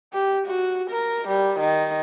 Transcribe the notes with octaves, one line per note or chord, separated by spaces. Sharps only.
G4
F#4
A#4
G3
D#3